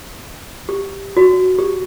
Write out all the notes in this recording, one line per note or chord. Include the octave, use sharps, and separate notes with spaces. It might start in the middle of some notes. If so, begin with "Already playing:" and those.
G4
F#4
G4